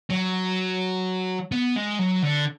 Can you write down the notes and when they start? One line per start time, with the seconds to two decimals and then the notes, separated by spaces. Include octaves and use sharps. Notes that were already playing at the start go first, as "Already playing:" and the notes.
0.10 F#3
1.52 B3
1.76 G#3
1.99 F#3
2.23 D3